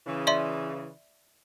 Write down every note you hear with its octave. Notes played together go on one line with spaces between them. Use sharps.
C#3 E3
D5 E5 C6